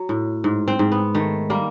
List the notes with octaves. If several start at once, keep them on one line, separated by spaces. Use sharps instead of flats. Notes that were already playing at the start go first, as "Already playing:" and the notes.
Already playing: F#3
A2
G#2
C4
G#2
B3
D#3 A3
G3 A#3